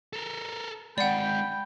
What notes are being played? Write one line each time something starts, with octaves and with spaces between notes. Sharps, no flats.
A4 A#4
G#3 C4 D5 F#5 G5 B5